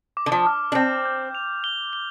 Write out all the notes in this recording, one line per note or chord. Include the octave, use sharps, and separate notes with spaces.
D6
D3
F3
F6
D4
C4 G6
G6
F7
G7
G7